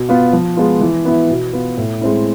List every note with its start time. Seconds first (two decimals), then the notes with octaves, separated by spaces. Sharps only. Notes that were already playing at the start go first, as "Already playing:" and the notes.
Already playing: B2
0.09 B3 F4
0.33 F3
0.57 G#3 B3 F4
0.81 E3
1.05 B3 E4
1.30 B2
1.53 B3 F4
1.77 A2
2.01 G#3 C4 E4